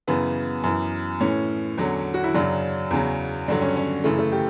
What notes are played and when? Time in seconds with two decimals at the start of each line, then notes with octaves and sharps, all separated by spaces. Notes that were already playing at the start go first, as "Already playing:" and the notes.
0.07 F#2 C#3 E3 B3
0.64 F#2 E3
1.20 A2 E3 C#4
1.77 E2 D3 F#3
2.14 F#4
2.24 E4
2.34 F#2 C#3 F#3 D4
2.91 E2 C#3 F#3
3.48 G2 D3 F#3 D4
3.62 C#4
3.76 C#4
4.04 F#2 C#3 E3 A3
4.19 A3
4.32 G4